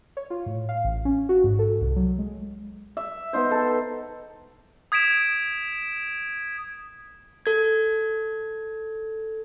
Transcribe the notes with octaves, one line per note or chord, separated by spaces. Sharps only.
C#5
F4
A2
F5
A1
C#4
F#4
G#2
A4
C2
F#3
G#3
E5
B3 D#4 C5
A4
D#6 G#6 B6 D7 E7
A4 G#6